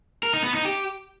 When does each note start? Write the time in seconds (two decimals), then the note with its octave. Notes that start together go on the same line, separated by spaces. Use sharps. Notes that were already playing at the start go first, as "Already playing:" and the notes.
0.23 A#4
0.33 D#4
0.44 B3
0.54 D#4
0.65 G4